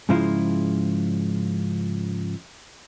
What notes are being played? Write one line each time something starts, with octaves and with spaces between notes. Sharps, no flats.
G#2 C#3 F3 G#3 E4 F4